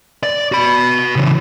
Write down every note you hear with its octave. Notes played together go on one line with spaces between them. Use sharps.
D5
F#4 B5
C#3 E3